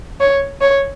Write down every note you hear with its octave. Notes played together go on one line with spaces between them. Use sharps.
C#5
C#5